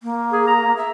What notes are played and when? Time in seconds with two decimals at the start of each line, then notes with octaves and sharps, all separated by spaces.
0.03 A#3
0.32 G#4
0.47 A#5
0.76 E5